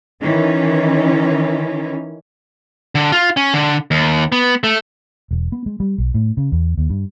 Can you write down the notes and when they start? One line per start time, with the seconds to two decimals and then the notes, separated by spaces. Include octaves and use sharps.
0.20 D#3 E3 C#4
2.95 D3
3.12 F4
3.37 C#4
3.54 D3
3.91 D#2
4.32 B3
4.64 A3
5.31 E1
5.52 B3
5.66 G#3
5.80 G3
5.98 B1
6.14 A2
6.37 C#3
6.52 E2
6.78 D#2
6.90 G2